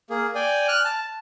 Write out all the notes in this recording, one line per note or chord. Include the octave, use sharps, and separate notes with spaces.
A#3 G#4
D5 G5 G#5
F6 F#6
A5